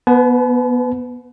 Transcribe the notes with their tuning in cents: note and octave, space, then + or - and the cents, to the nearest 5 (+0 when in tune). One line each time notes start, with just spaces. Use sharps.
B3 -15 B4 +30 A5 -45